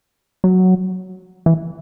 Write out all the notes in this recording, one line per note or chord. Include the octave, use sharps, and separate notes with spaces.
F#3
E3